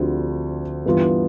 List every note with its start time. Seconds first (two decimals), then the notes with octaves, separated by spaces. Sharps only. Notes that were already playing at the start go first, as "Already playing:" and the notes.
Already playing: D2 D3 F3 C4 G4
0.86 G2 E3 B3 F4